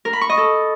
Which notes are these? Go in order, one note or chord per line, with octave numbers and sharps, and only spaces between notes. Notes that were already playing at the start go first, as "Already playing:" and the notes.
A#4
B5
C#6
D#5
A4